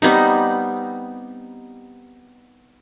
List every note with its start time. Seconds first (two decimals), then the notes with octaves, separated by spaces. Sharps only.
0.02 G3 B3 C4 D#4